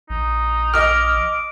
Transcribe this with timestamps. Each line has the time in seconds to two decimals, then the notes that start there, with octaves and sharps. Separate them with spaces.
0.10 A#1 D#4
0.74 D#5 D6 F6